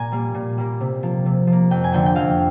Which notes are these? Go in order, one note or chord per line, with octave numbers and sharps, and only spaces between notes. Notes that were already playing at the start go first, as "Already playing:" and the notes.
Already playing: A#2 G#5 A#5
G3 A#3
A#2
G3 A#3
C3
F3 A#3
C3
F3 A#3
F2 G5
G#5
D3 F3 A#3 G5
G5
F2 F5